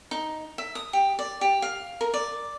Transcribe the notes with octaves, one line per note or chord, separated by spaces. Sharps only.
D#4
E5
D#6
G4
D5
G4
F5
A#4
D5